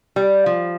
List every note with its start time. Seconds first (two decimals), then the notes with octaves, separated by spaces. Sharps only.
0.16 G3
0.46 F3